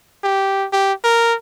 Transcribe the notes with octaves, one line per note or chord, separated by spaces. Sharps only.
G4
G4
A#4